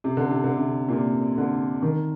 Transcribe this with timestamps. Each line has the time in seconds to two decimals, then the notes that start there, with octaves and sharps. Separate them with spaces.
0.04 C3
0.17 D3
0.31 C3
0.44 D3
0.57 C3
0.89 A#2
0.92 C3
1.38 D3
1.82 D#3